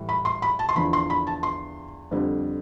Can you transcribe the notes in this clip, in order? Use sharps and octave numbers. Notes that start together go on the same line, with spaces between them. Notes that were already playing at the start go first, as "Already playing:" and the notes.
Already playing: A2 E3 G3
B5
C6
B5
A5
C6
E2 D3 F3 B5
C6
B5
A5
C6
F2 D3 G3